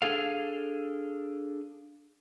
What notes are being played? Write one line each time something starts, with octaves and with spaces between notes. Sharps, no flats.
D4 G#4 A4 F5